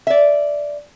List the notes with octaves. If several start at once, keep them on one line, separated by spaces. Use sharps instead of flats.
D5 E5